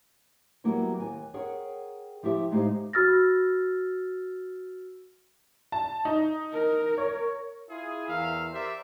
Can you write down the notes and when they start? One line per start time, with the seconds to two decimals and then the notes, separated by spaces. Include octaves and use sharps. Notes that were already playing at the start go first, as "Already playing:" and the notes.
0.64 F#3 G3 A#3 B3 E4
0.98 D#2 G#5
1.34 G#4 A#4 C#5 F#5 G5
2.23 F3 E4 G4 E5
2.51 A2 G#3 D#4 G4 C5 F5
2.93 F#4 E6 F6 A6 A#6
5.72 A5
6.05 D#4
6.52 A#4
6.98 C#5
7.70 E4 F4 G#4
8.07 E2 A#4 E5 F5
8.53 G4 A#4 C5 D5 E5